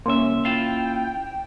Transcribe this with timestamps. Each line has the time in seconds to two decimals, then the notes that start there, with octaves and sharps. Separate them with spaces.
0.06 C2 A#3 C#4 E5 C6
0.45 E4 F4 F5 G5 A6 E7 G7